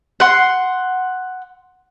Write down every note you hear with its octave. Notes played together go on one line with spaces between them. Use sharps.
F#5 C6